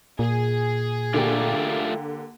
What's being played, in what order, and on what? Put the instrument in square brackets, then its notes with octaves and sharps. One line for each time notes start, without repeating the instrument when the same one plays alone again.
[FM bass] A#2 [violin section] G#4
[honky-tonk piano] D3 A#3 G4 [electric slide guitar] A3 F4 D5